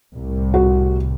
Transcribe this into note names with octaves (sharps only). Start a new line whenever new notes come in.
C2 A2 C3
F#4